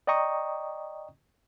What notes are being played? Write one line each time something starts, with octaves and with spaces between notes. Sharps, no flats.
D5 D#5 G5 A#5 C#6 D#6